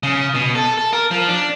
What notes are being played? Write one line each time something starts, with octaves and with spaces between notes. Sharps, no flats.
C#3
B2
A4
A4
A#4
F3
D4